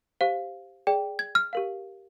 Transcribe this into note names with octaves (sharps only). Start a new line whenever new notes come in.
G4 C5 F5
G#4 D5 G5
G#6
F6
G4 A#4 F5